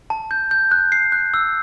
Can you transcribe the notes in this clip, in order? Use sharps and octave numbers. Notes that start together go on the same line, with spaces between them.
A5
G6
G6
F#6
C7
F#6
E6